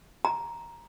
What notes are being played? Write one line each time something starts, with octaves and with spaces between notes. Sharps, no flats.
A#5